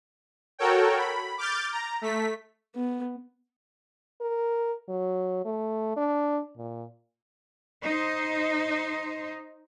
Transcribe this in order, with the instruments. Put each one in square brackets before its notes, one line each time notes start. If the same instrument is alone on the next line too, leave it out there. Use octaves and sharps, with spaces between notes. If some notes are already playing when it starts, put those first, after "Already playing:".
[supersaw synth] F#4 A4 A#4 C#5 G5
B5
D6 F6 G6 A6
A#5
A3 B6
[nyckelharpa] B3
[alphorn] A#4
F#3
A3
D4
A#2
[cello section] D#4 C5